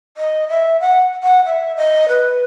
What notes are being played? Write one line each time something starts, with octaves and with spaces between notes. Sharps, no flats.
D#5
E5
F#5
F#5
E5
D#5
B4